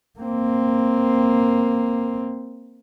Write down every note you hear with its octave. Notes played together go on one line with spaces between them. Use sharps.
A#3 C4